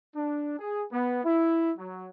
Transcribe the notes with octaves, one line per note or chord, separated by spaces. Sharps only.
D4
G#4
B3
E4
F#3